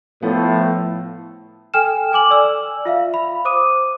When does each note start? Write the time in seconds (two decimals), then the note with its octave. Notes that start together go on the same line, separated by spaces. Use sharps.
0.23 A2 F3 B3
1.74 A4 G5 G#5 F6 E7
2.12 A4 G#5 D6 F#7
2.30 D5 E6
2.85 F4 E5 F5
3.14 B5
3.45 C5 D6 D#6 D#7